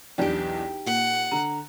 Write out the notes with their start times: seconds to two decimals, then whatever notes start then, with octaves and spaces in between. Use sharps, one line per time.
0.18 B1 E2 D4 D#4 G4 G5
0.86 A#2 F#5
1.32 D3 A#5